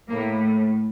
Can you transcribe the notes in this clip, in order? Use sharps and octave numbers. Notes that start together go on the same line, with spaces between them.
A2 A#3